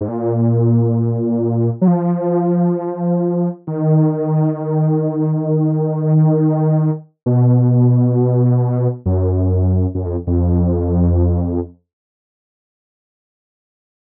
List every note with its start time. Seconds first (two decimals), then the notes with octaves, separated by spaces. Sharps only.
0.01 G#2
0.08 A#2
1.82 F#3
1.88 F3
3.67 D#3
7.26 B2
9.06 F#2
9.95 F#2
10.06 F2
10.27 F2